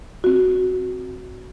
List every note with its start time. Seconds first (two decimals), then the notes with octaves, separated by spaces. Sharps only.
0.24 C4 F#4